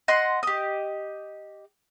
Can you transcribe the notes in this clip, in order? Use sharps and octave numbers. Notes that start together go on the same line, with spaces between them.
D#5 F#5 C6
G4 D#5